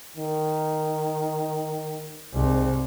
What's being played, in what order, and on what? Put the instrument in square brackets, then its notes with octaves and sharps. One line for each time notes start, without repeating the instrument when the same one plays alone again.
[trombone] D#3
[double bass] C2 [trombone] G#2